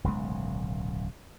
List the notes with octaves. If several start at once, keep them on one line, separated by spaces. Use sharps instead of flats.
D1 B1 C#3 G#3